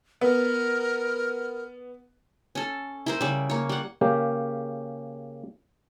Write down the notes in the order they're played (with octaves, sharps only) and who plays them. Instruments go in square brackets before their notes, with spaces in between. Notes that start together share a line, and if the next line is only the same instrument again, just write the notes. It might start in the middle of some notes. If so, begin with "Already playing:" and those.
[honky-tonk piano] B3 [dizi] A#4
[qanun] C#4 A4
E4 A#4 C5
C#3 G3
A#3 C#5
G3 F#5
[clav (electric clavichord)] C#3 A#3 C#4 G4